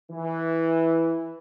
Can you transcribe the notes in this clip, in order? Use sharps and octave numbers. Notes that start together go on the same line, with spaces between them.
E3